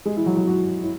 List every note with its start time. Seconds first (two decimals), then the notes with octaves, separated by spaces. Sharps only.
0.06 G#3
0.16 E3 E4
0.26 F#3 F#4
0.36 F#3 F#4
0.47 F#3 F#4
0.83 E4